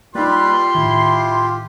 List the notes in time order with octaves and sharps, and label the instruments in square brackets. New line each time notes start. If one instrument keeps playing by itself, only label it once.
[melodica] G3 B4 D5 [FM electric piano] A#3 D#4 [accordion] F4 G4 [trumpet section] C6
[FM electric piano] A2 D#3 [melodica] E4